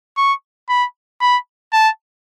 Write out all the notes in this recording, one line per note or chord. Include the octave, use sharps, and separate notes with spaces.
C#6
B5
B5
A5